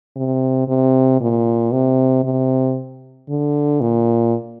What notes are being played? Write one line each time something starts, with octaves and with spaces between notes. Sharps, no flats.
C3
C3
A#2
C3
C3
D3
A#2